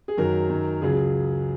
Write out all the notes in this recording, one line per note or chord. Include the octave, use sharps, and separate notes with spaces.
G#4
F#2 D#3 F#3 A#4
F#2 D#3 F#3
C#2 C#3 F#3 G#4
G#4